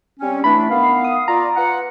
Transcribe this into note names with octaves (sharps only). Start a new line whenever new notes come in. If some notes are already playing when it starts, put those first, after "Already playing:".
G3 C4 C#4
E3 A3 D4 B5
D#3 B3 F5
D#6
F4 D5 A#5
F4 B4 F#5